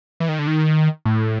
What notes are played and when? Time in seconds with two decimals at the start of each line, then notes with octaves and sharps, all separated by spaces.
0.20 E3
0.29 D#3
0.39 D3
0.47 D#3
1.06 A2